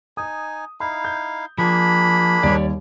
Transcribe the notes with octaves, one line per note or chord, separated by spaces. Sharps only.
D#4 G#5 D#6
D#4 E4 F5 B5
G6
F3 A#3 D4 G#4 B5
D#2 G3 C#5 D5